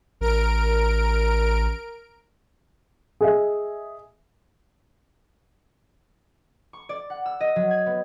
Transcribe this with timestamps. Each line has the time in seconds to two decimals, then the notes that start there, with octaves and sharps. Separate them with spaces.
0.21 A1 A#4 D7
3.21 G#4 D#5 E5
6.73 C#6
6.89 D5
7.10 F#5
7.26 E6
7.41 D#5
7.56 F#3
7.71 G#6
7.86 B3